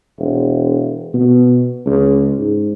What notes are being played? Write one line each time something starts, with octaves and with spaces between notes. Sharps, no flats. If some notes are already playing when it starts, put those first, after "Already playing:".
E1
B2
C#2
G#2